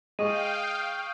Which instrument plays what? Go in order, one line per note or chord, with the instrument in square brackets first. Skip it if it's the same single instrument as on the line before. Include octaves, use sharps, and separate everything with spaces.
[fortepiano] G#3 [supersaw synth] F5 G5 [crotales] C#6 D#6 D#7